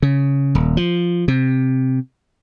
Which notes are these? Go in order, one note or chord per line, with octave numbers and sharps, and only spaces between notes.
C#3
D#1
F3
C3